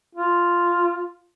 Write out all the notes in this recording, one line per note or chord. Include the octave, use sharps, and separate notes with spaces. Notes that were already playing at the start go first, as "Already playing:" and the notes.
F4